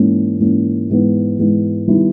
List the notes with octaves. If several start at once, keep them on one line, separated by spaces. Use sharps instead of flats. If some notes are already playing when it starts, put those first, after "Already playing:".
Already playing: G#2 E3 A#3 C#4
G#2 E3 A#3 C#4
G#2 E3 G#3 B3
G#2 E3 G#3 B3
D#3 G3 B3 E4